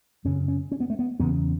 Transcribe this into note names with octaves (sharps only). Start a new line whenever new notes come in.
F#2 C#3 C#4
C#4
C#4
B3
A3
B3
E2 C#3 B3